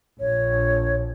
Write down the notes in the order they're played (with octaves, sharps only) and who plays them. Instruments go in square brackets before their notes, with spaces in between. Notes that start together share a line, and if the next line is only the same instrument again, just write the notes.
[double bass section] A#1 [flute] C#5